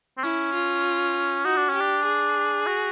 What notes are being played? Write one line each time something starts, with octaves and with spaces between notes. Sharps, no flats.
C4
C#4 E4
F4
D#4 F#4
D4
C#4
G4
D4
G#4
F#4